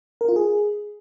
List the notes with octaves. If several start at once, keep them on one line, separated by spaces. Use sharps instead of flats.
A#4
F4
G#4